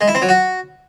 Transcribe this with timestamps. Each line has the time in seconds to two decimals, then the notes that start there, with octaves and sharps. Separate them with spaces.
0.01 G#3
0.08 E4
0.15 C4
0.22 F#3
0.29 F#4